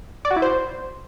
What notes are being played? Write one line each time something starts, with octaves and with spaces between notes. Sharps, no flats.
D5
F#4
E4
C5